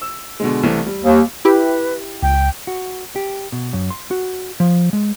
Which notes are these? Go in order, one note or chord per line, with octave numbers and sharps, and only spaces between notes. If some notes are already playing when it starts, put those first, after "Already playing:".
E6
B2 D3 G#3
C2 E3 A3
G3
D#2
E4 G4 B4
C#2 G5
F#4
G4
B2
F#2
C6
F#4
F3
G#3